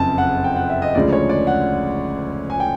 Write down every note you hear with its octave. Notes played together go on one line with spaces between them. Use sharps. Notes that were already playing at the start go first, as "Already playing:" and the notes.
Already playing: F#1 F2 C#3 A5
F#5
G5
F#5
E5
D#5
D2 C#3 F3 G#3 D5
C#5
D5
F#5
G#5
G5